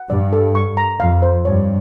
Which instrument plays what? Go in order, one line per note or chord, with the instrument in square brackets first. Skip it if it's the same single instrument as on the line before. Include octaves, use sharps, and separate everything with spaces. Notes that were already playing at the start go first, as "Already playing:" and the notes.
Already playing: [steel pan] F#5
[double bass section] G2 [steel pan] D5
[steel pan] A4
C#6
A#5
[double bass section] F2 [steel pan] F5
[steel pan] C5
[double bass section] G2 [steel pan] C#5